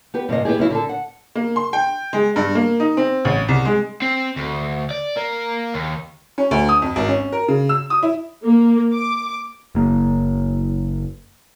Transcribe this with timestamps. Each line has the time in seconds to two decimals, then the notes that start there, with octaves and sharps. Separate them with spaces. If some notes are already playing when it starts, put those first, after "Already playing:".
0.14 B3 G4 B4
0.29 G2 C3 E3 A#3 D#5
0.45 B3 E4 G4 G#4
0.59 F#2 F#3 E4 F4
0.70 D3 A4
0.89 F#5
1.35 A#3
1.56 C6
1.73 G5
2.13 G#3
2.36 G2
2.55 A#3
2.80 D#4
2.97 C4
3.25 A1
3.48 C2
3.65 G#3
4.02 C4
4.36 D2
4.91 D5
5.16 A#3
5.74 D#2
6.38 C#4
6.51 D2
6.69 D#6
6.82 F2
6.96 G#1
7.08 C#4
7.32 A#4
7.48 C#3
7.69 E6
7.90 D#6
8.03 E4
8.44 A#3
8.94 D6
9.75 F#1 A#3